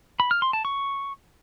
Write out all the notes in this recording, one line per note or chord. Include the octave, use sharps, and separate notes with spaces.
B5
F6
C6
A5
C#6